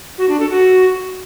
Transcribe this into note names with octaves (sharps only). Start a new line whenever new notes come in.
F#4
D4
A4
F#4